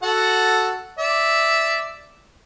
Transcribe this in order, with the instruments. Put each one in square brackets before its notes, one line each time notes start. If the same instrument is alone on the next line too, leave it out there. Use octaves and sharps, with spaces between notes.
[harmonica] F#4 A4 F#5
D5 E5